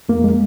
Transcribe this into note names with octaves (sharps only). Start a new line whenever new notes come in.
F2 A#3
G#3